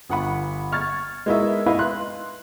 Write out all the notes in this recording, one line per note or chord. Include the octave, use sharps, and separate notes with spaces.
G1 F#5 B5
C#6 F6 G#6 A6
G#3 B3 D#4 E4 A#4 E5
D#4 E4 B4 F5 B5
C6 F#6